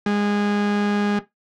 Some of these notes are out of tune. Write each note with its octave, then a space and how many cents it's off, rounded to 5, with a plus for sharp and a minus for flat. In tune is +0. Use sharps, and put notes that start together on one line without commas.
G#3 -20